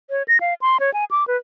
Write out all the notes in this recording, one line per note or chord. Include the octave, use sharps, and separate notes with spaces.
C#5
A#6
F5
C6
C#5
G#5
D6
B4